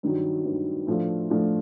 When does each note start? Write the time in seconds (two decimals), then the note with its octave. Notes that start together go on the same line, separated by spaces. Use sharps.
0.03 G2 D#3 F#3
0.46 G2 D#3 F#3
0.87 A2 F3 A3 D4 F4
1.30 A2 F3 A3 D4 F4